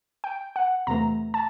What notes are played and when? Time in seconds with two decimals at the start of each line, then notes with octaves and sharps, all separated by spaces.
0.24 G5
0.56 F#5
0.87 E2 C3 E3 A3 A#5
1.34 A5